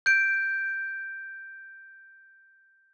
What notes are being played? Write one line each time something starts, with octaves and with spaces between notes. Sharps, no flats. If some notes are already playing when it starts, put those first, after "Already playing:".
G6 D7